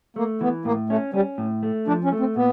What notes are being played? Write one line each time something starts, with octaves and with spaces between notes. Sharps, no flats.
A3 A#3
E3 B3
A2 A#3
A3 C#4
G3 C#4
A2
A3
F3 D4
C#4
A3
C4
A#2 B3